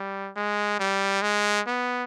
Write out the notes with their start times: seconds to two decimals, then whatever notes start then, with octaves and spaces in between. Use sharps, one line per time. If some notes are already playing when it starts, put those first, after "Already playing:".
Already playing: G3
0.36 G#3
0.79 G3
1.22 G#3
1.67 B3